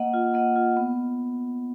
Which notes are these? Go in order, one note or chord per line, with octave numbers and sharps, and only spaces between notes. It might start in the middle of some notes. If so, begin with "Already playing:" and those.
Already playing: A#3 D#5 F#5
F4
A#3 D#5 F#5
F4
B3